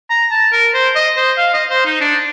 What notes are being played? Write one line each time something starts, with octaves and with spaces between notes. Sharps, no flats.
A#5
A5
A#4
C5
D#5
C5
F5
D#5
C5
D#4
D4